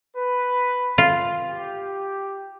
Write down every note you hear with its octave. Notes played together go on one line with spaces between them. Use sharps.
B4
F4
G4